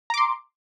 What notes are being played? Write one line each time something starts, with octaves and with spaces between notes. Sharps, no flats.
A#5 C6 D6